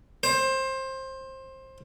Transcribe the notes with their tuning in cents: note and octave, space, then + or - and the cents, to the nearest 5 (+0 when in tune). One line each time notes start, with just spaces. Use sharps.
C5 +20